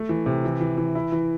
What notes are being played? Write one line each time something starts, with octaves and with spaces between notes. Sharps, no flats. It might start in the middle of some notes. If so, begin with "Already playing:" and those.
Already playing: A3
E3
C3
E3
E3
E3
E4
E3